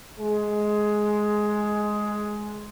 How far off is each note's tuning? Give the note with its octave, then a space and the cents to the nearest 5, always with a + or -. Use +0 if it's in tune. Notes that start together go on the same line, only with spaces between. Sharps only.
G#3 +10